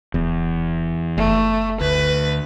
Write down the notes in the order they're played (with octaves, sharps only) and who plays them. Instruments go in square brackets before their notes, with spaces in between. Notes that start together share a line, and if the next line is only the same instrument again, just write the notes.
[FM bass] D1 [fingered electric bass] E2
[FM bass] F#1 [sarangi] A3
[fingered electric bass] D2 [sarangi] B4